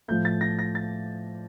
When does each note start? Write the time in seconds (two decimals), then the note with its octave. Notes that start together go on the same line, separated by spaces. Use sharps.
0.08 A2 F3 G6
0.25 A6
0.41 A#6
0.59 A#6
0.75 A6